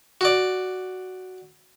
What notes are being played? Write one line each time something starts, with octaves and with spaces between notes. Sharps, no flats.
F#4 D5